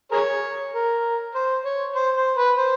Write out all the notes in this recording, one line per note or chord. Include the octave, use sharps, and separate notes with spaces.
G#4 A#4 C#5
A#4
C5
C#5
C5
C5
B4
C5